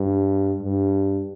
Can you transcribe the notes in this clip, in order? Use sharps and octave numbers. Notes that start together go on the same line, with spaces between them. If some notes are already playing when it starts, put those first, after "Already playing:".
Already playing: G2
G2